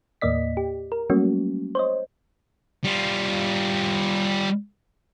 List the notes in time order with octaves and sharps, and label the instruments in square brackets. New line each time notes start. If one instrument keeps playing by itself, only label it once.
[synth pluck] D#2 A2 A#3 D5 D#5 B6
G4
A#4
F#3 G3 A3 A#3 C#4 F#4
C5 C#5 D#5
[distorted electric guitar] G3 F4